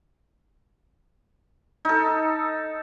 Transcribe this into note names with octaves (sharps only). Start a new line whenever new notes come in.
D#4 A4